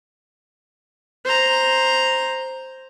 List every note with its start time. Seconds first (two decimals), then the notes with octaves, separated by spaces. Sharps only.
1.25 C5 A#5